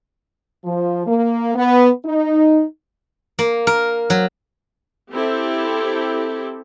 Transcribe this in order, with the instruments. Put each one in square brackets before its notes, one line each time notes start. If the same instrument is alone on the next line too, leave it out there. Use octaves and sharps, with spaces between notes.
[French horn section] F3
A#3
B3
D#4
[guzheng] A#3
A#4
F#3
[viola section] C4 E4 G4 A4